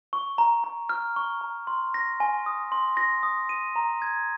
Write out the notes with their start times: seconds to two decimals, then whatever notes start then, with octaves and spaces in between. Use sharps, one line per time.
0.13 C#6
0.38 A#5
0.64 A#5
0.89 F6
1.16 C#6
1.41 A#5
1.67 C6
1.94 A#6
2.20 G#5
2.46 D#6
2.72 C6
2.97 A#6
3.23 D#6
3.49 D#7
3.76 A#5
4.02 G#6